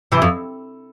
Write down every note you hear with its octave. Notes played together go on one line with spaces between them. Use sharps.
C3 E3
F2